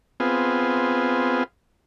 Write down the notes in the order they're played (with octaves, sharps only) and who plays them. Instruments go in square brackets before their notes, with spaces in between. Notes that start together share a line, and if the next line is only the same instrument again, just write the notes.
[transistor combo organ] B3 C4 F4 G#4